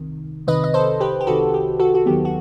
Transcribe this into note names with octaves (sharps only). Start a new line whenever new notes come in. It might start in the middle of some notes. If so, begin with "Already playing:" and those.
Already playing: C2 C3 D#3
C2 C3 D#3 B4 D#5
D#5
A4 C5
G4 B4
G4
C2 C3 D#3 F#4 A4
G4
F#4 A4
F#4
D#2 D#3 F#3 B3 G4
F#4